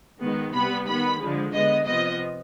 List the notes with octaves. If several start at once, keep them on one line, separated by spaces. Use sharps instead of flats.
D#3 G#3 B3
C3 G3 B3 B5
D#3 B3 B5
D3 F3 G#3
D3 G#3 B3 D#5
C3 F3 B3 D#5